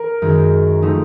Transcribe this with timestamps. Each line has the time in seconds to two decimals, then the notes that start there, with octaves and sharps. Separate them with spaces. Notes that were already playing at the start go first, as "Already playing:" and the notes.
Already playing: A#4
0.22 F#2 D#3 G#3
0.82 F3 A3 C4 D#4